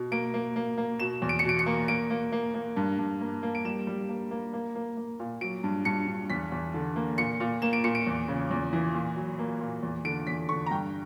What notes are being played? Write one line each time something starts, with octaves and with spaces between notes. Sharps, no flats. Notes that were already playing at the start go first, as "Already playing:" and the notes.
Already playing: B2
A#3 D7
A#3
A#3
A#3
B2 E7
E2
D7
C#7
B2 D7
C#7
A#3
A#3 D7
A#3
A#3
A#3
G2
G2
A#3
A#3
D7
G3 E7
G3
A#3
A#3
A#3
A#3
A#3
A#2
F#3 D7
G2
G2 C#7
G2
E2 B6
E2
D3
A#3
A#2 C#7
A#2
A#3 E7
D7
A#2 C#7
D7
E2
C#3
E2
E3
A#2
F#3
A#3
A#2
E2
D3 D7
E2 B6
D3 C#6
A#5
G2 G5